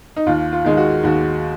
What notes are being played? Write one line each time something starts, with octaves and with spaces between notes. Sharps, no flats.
D#4
D#2 F4
F4
D#3 G#3
F#4
D#2 F#4